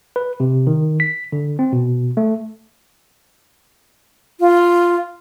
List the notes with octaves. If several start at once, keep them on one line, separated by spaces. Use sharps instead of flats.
B4
C3
D#3
B6
D3
C4
B2
A3
F4